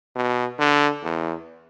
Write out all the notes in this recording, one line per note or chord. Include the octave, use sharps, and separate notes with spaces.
B2
D3
E2